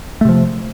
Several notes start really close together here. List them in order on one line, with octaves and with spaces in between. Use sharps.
A3 C3 F3